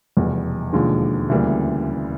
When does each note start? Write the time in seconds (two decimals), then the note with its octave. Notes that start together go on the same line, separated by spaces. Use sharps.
0.17 F1 E2 B2 G3
0.73 E1 D#2 D3 F3 G#3
1.29 D2 C#3 E3 G3 A#3